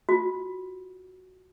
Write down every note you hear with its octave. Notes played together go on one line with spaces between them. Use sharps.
F4 F#4